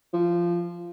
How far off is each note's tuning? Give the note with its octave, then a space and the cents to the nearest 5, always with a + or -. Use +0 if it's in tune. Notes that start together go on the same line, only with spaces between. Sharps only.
F3 -15